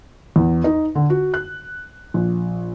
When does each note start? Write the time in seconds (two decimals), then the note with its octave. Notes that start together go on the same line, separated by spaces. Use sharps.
0.36 E2
0.64 D#4
0.95 D3
1.10 F#4
1.34 F#6
2.14 A#1